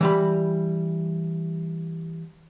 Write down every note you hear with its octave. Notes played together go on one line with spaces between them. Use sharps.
E3 G3 B5